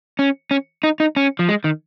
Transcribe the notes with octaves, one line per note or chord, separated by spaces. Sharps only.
C#4
C#4
D#4
D#4
C#4
F3
G#3
D#3